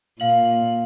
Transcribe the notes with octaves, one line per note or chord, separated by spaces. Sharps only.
A#2 F5 F#7